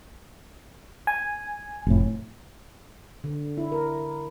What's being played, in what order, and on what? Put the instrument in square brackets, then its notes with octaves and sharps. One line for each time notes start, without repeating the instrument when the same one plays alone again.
[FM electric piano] G#5
[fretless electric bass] F1 A2
[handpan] D3
E4
A#4